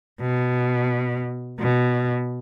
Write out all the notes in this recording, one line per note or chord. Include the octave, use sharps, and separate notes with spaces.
B2
B2